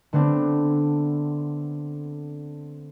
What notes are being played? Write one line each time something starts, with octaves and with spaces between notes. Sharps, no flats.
D3 A3 B3 C4 D4